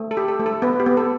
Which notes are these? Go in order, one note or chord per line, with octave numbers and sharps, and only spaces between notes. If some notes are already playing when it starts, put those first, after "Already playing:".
Already playing: A3
A4
G4
A4
A3
A4
B3 B4
G4
B3
A4